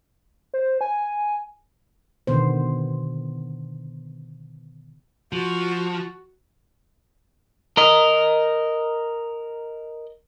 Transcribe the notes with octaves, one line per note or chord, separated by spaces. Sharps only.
C5
G#5
B2 D3 D#3 B3 C5
F3 F#4
A#4 D#5